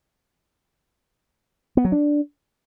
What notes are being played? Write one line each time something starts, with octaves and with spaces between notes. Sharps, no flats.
B3
F#3
D4